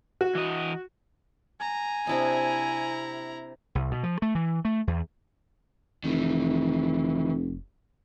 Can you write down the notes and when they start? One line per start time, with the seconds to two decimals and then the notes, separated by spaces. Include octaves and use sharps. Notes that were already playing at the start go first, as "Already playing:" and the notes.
0.21 F#4
0.35 E3 D#5
1.61 G#5 A#5
2.07 C3 D4 E4 D#5 A#5
3.75 C2
3.91 B2
4.03 F3
4.22 A3
4.35 E3
4.65 A3
4.87 E2
6.04 F1 D#3 E3